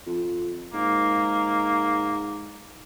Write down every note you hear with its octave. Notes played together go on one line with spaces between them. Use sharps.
F2
G#2 A#3